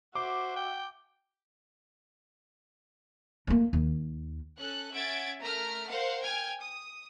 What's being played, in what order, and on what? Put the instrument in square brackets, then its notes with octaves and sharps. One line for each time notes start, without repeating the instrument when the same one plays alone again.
[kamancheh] F#4 E5 [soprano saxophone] C5 [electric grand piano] D6
[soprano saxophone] G5
[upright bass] A3 A#3
D#2
[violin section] C#4 A4 F#6
C#4 E5 F#5 G#6 A6 D7
A3 A#4 A#5 F6
A#4 C5 F5 F#5
G5 G#5 F6 G#6
D#6